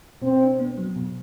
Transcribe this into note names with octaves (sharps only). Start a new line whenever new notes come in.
B2 C4
D4
B3
F#3
B2